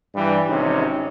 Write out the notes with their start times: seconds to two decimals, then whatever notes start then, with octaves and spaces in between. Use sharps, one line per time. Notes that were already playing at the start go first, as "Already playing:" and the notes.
0.15 G2 E3 G3
0.49 G#1 C3 C#4 D#4